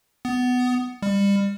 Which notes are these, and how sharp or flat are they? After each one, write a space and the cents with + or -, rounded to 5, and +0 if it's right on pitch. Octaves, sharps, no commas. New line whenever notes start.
B3 +15
G3 +30